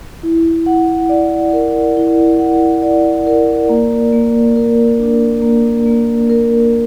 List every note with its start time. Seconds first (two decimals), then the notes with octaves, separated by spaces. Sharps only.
0.23 E4
0.66 F#5
1.09 D5
1.53 A#4
1.97 E4
2.39 F#5
2.82 D5
3.27 A#4
3.69 A#3
4.13 A#3
4.56 A#4
4.99 D4
5.42 A#3
5.86 A#3
6.30 A#4